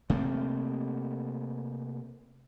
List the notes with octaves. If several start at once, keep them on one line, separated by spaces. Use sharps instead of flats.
C3 A3 A#3